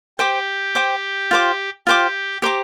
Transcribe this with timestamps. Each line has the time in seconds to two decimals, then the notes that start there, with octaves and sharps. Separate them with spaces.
0.19 G4 C5 G5 D6
0.75 C5 G5 D6
1.31 F4 C5 G5 D6
1.87 F4 G4 C5 G5 D6
2.42 G4 C5 A#5 D6